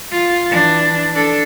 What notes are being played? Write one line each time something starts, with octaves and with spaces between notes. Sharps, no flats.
F4
E3 D4
D4 A4